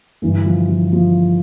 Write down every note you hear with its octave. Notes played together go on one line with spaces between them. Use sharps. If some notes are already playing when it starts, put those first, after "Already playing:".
G2 D3 E3
F3
F3
F3